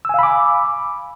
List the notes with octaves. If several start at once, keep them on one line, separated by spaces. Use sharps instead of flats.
F5 G#5 B5 D6 E6